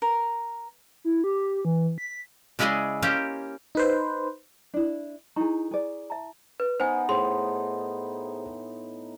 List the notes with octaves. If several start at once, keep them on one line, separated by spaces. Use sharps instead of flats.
A#4
E4
G4
E3
B6
C#3 G#3 E4 G#4 D5 D#5
A#3 C#4 G4 C5
D#4 B4 C5
D4 E4
D#4 E4 G#4 A#5 C#6
G#4 D5
E5 A5 A#5
B4
B3 D#4 C5 G#5
A2 G#4 C5 C6